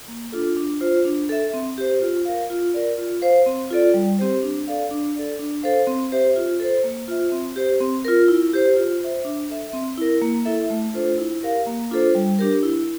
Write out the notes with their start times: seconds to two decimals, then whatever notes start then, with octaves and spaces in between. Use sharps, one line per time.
0.08 A#3
0.32 D4 F4 A4
0.57 D4
0.81 F4 C5
1.05 D4
1.29 A4 E5
1.54 C4
1.78 G4 C5
2.01 F4
2.25 A#4 F5
2.50 F4
2.74 A#4 D5
2.98 F4
3.22 C5 F5
3.46 C4
3.70 F4 A4 D5
3.94 G3
4.19 C4 G4 C5
4.43 D4
4.67 A4 D5 F5
4.91 D4
5.15 A4 D5
5.39 D4
5.63 A4 C5 F5
5.87 C4
6.12 G4 C5 E5
6.36 F4
6.60 A4 C5
6.84 A#3
7.08 F4 C5 E5
7.32 C4
7.56 G4 C5
7.80 C4
8.05 F4 A#4
8.28 E4
8.53 G4 C5
8.76 F4
9.01 C5 E5
9.25 D4
9.50 A4 E5
9.73 C4
9.98 E4 A#4
10.22 A#3
10.45 E4 A4 E5
10.70 A3
10.94 D4 F4 A4 C5
11.18 E4
11.42 G4 A#4 F5
11.67 A#3
11.91 D4 F4 A4 C5
12.15 G3
12.39 D4 G4 A#4
12.63 E4